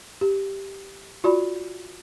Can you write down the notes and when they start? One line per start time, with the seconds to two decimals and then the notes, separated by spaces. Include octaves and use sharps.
0.21 G4
1.24 F4 F#4 D5 B5